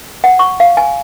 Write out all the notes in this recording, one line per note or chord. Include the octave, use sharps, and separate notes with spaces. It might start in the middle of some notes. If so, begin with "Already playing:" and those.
F#5
C#6
F5
G#5